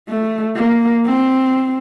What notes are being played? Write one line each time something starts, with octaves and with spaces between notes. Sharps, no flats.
A3
A#3
C4